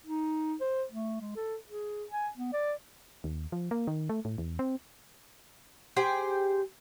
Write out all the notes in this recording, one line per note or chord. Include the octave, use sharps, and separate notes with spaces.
D#4
C5
A3
G#3
A4
G#4
G#5
B3
D5
D#2
F3
A#3
D#3
A3
A2
E2
C4
G4 G#4 C5 G5